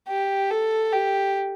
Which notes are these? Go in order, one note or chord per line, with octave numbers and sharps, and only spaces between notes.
G4
A4
G4